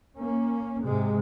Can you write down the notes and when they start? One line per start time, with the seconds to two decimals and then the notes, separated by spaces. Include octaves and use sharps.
0.17 A#3 C#4
0.85 G#2 C3 G#3